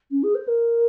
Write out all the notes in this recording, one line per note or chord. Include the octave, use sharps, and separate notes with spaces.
C#4
G#4
C5
A#4